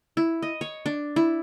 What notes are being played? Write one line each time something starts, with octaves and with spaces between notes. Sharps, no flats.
E4
D#5
C#5
D4
E4